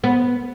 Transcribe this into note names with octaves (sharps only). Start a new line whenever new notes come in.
B3